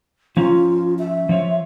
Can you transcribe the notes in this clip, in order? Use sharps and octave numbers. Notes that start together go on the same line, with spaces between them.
F3 C#4 F4 A#5
E5
F3 F4 C#5